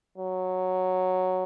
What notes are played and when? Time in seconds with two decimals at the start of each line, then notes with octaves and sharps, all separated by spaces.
0.18 F#3